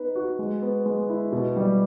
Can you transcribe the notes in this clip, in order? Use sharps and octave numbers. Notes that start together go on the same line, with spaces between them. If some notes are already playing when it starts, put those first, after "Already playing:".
Already playing: B3 D#4 B4
F#4
G#3
B3
G#3
E4
B2
G3